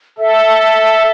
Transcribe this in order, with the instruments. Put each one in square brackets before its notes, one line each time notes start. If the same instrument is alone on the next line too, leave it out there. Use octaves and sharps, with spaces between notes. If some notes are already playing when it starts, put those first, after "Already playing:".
[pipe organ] A4 [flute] E5